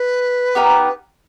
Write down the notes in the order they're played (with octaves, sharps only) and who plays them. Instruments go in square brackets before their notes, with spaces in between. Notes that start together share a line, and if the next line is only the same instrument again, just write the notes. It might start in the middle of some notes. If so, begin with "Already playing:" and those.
Already playing: [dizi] B4
[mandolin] B3 D#4 G4 A#4